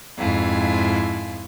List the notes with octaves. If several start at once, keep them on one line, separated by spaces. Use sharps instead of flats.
F2 G#2 E4 F4 G#5